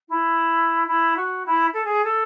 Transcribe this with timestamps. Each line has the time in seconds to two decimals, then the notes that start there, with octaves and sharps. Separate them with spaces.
0.08 E4
0.87 E4
1.16 F#4
1.45 E4
1.73 A4
1.84 G#4
2.04 A4